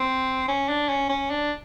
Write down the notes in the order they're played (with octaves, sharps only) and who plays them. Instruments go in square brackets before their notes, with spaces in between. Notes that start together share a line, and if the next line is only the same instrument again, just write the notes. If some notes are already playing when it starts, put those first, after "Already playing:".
Already playing: [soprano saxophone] C4
C#4
D4
C#4
C#4
D4